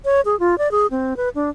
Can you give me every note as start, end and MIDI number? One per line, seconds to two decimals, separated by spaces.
0.05 0.21 73
0.25 0.38 68
0.40 0.58 65
0.58 0.71 74
0.71 0.87 68
0.91 1.17 60
1.17 1.29 71
1.35 1.50 62